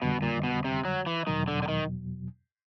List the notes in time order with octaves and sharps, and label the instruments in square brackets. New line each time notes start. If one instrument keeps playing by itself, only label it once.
[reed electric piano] F2 D3 G3 [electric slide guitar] B2
[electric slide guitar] A#2
B2
C3
F#3
E3
[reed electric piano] E2 B2 F#3 [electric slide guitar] D#3
[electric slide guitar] D3
D3
D#3